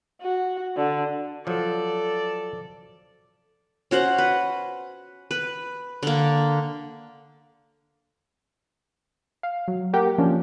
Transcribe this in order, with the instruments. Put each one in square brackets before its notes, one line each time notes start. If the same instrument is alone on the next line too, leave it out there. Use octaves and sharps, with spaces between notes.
[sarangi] F#4
D3
[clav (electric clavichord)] F3 F#3 [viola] A4 D5
[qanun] C#4 F#4 C5 F#5
B4
B4
D3 A#3
[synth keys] F5
F#3
A#3 G4 A#4 F#5
F3 A#3 C#4 D4